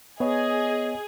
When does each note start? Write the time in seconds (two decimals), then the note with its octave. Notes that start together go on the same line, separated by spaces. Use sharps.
0.20 B3 G#4 C#5 D#5